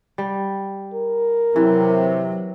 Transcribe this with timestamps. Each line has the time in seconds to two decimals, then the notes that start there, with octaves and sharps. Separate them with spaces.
0.18 G3
0.94 A#4
1.56 C3 E3 F#3